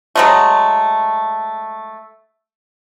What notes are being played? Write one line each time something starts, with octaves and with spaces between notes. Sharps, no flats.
F#3 G#3 A3